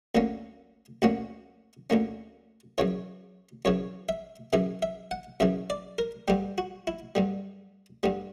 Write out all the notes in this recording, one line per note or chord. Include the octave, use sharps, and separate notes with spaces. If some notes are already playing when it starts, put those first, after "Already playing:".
D2 D3 A#3 C#4
D2 D3 A#3 C#4 F#4
D2 D3 A#3 C#4
F#2 C#3 E3 C#5
F#2 C#3 E3 C#5
E5
F#2 C#3 E3 E5
E5
F#5
F#2 C#3 E3 E5
D5
A#4
G2 D3 G3 G4
F#4
E4
G2 D3 G3
G2 D3 G3